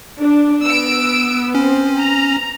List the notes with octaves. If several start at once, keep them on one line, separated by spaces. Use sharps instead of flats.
D4
B3 E6 D7
C4 C#4
A#5